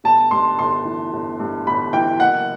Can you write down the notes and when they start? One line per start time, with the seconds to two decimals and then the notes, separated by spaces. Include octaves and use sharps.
0.04 G1 A5
0.31 G2 C6
0.59 G1 C6
0.85 E3
1.13 G1
1.40 G2
1.67 G1 B5
1.93 E3 G5
2.20 F#1 F#5